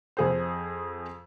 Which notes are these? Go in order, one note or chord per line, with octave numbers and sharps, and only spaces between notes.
F2 G#4 C5